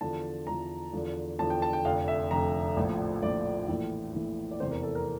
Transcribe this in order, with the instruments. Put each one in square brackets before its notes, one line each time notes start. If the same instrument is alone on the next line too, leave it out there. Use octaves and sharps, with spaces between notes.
[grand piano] E2 D3 F3 A5
E2 D3 F3 A#5
E2 D3 F3
E2 D3 F3 A5
G5
A5
G5
F1 F2 D3 F5
E5
F1 F2 D3 A#5
A#1 A2 F3
A#1 A2 F3 D5
A#1 A2 E3
A#1 A2 E3
D5
F1 E2 C3 E3 C5
A#4
A4
A#4